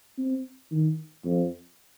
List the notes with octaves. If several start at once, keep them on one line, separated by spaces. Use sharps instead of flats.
C4
D#3
F2